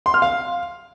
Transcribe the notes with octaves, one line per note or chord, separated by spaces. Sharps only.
C6
F6
F5